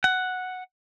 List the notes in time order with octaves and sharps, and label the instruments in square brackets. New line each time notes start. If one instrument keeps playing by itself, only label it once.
[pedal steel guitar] F#5